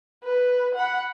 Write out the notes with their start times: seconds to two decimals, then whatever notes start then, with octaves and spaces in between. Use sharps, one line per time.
0.24 B4
0.75 F#5 B5